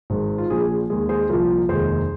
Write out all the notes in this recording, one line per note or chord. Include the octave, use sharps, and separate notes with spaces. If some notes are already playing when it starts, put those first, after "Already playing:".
G#1 G#2 D#3 G#3
F4
A#1 A#2 F3 G#4
G#4
D#2 D#3 G#3 G#4
G#4 C5
C2 A#2 F3 F4 A#4
F1 D#2 D#3 G#3 G#4 C5